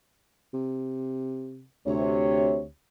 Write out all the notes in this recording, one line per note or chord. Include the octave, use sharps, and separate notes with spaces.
C3
D2 C3 C#5